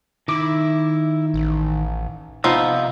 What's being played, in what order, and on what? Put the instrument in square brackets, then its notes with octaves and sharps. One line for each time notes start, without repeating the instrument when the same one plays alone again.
[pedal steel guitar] D#3 D6 [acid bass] E4
[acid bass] A1
[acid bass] C3 [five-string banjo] F3 B3 D#4 [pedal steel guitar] E6 F6